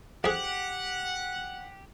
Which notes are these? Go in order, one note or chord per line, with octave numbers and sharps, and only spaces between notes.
F2 G4 G#4 F#5